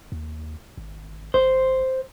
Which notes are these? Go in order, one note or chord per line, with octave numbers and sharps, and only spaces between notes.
D#2
G#1
G#1 C5